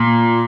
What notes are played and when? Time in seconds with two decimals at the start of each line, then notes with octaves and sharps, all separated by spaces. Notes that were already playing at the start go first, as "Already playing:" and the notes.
Already playing: A#2